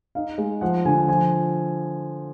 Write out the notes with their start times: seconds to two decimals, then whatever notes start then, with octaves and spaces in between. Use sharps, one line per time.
0.15 D#4 F5
0.38 G#3
0.61 F3 F#5
0.85 D3 G#5
1.08 F3 G#5